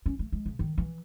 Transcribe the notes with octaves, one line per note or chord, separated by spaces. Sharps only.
C#4
A3
G#3
C#3
D#3
E3